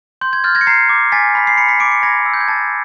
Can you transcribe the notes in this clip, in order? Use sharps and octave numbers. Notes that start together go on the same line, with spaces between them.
C6 G6
G#6
F6 G6 A6
G#6 A#6
C#7
A#5 A#6 C7
D6
G#5 A6 B6
B5 B6
C7
B5 B6 C#7
B6 C#7
D6 C7 D7
B6 C#7
B5 G#6 A#6
E6
G6
G#6
A5 G6 A6